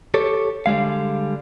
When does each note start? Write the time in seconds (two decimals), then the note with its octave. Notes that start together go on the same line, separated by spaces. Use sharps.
0.14 G4 A4 C#5
0.66 D3 G3 G#3 F5